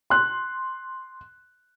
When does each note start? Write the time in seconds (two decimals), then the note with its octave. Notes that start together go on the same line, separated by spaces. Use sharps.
0.10 C6 F#6